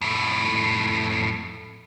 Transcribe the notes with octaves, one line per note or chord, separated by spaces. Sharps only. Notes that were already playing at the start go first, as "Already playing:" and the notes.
F2 A2